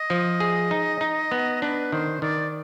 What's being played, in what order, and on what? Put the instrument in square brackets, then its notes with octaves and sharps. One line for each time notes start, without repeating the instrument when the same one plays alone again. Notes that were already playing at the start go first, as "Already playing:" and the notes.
Already playing: [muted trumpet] D#5
[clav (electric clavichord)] F3
G#4
D#4
D#4
B3
[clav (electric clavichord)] D4 [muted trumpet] B4
[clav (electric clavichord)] D#3 [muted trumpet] C5
[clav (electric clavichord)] D#3 [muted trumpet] D5